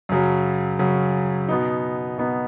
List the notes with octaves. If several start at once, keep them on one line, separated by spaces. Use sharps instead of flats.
F#2 C#3 F#3
F#2 C#3 F#3
B2 B3 D#4
B2 B3 D#4